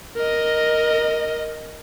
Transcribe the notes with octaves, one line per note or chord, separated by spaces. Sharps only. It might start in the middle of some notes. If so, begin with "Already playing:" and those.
A#4 D#5